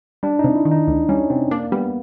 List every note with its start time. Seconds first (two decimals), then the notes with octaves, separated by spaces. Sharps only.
0.23 G3 D4
0.39 C3 D#4
0.56 E4
0.65 D#3
0.71 D#4
0.87 D2
1.09 G3 C#4
1.30 C3 C4
1.51 A#3 D4
1.72 G3 B3